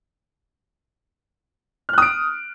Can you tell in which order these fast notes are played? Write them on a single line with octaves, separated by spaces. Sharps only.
F6 F#6 D#6 D7